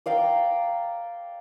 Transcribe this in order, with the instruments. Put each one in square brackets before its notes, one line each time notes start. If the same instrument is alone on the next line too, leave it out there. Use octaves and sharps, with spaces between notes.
[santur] D5 F5 G5 A#5